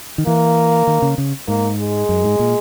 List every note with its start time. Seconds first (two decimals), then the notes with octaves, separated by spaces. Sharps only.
0.18 D#3
0.27 E3 A#3
0.87 D#3
1.02 C#3
1.18 C#3
1.48 G#2 A#3
1.79 G#3
2.09 F#2
2.24 G#2
2.39 A#2